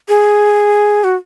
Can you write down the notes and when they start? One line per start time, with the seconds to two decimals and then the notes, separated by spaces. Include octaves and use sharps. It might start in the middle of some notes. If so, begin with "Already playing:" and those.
0.08 G#4
1.04 F#4